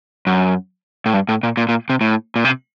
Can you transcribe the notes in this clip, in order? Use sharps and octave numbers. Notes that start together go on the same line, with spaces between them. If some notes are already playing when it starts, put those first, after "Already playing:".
F#2
A2
G2
A2
A#2
A#2
A#2
C3
A2
A#2
C3